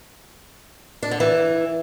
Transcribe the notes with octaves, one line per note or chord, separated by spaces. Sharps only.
D4
D3
E3